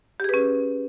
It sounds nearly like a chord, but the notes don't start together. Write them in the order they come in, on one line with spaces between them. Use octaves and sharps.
G4 G#4 B4 C#4